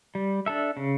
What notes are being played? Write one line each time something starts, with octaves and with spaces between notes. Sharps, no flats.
G3
D4 A4 E5
C#3